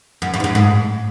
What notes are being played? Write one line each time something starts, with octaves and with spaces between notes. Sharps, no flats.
F#2
F#2
G#2
F#2
G#2